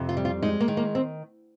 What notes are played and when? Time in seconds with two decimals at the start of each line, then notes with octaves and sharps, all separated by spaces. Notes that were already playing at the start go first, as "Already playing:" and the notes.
Already playing: F2 C3
0.09 F4
0.17 G3
0.25 F4
0.42 G#3 D#4
0.60 A#3
0.68 D#3
0.77 A#3
0.95 C4